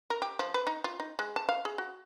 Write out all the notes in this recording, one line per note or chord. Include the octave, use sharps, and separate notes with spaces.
A#4
G4
F3
B4
D#4
F4
D#4
G#3
A5
F5
G#4
F#4